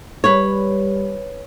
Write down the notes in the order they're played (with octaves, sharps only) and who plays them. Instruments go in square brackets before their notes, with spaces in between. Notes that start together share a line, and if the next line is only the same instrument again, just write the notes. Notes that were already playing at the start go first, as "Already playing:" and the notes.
[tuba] G3 [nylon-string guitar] B4 C#5